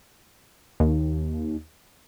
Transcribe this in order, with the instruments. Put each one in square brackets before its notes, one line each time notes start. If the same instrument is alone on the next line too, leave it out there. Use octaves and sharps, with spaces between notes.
[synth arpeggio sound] D#2